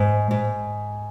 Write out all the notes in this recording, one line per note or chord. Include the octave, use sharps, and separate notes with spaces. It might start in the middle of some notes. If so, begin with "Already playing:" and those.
Already playing: G#2
G#2